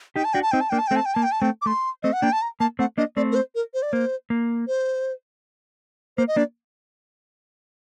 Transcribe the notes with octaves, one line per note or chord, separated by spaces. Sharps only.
D#4 G4 G5
A5
D4 F#4 G5
A5
C4 D#4 G5
A5
A#3 D4 G5
A5
A3 C4 G5
A5
G5
A#3 A5
G5
A5
A3 C4 G5
D6
A3 C6
A3 C4 D#5
F#5
A#3 D4 G5
A5
A#5
A#3 A5
A3 C4 F#5
A#3 D4 D#5
A3 C4 D5
A#4
C5
A#4
C5
D5
A#3 C5
A#3
C5
A#3 C5
D#5
A#3 D4 D5